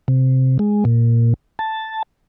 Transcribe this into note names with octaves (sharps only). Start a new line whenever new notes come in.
C3
G#3
A#2
A5